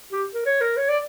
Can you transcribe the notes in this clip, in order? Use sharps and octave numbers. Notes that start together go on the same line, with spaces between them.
G4
A#4
C#5
A#4
C#5
D5